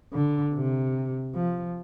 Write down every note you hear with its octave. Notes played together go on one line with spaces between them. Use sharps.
D3
C3
F3